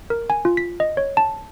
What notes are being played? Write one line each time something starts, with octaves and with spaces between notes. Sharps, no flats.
A#4
G#5
F4
B6
D#5
C#5
A5